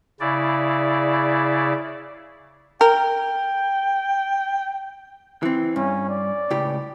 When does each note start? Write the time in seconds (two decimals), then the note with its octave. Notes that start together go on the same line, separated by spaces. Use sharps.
0.20 C#3 E4 D5
2.81 A#4 G5
5.43 E3 C4
5.76 G2 C#4
6.09 D5
6.50 C#2 A2 G4